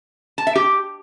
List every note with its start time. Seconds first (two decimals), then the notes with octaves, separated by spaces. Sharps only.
0.38 A5
0.47 E5
0.56 G4